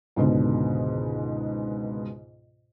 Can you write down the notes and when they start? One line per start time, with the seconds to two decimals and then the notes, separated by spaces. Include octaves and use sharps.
0.16 C#2 G#2 B2 D3